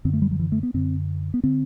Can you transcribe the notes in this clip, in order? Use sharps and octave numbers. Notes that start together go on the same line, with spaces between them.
F#2 D3 C4
A3
G3
F#3
E3
A3
B3
F#2 D3 C4
B3
D3 C4